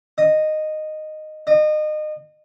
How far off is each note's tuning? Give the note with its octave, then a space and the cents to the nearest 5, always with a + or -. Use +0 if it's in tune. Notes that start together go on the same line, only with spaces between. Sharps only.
D#5 -10
D#5 -30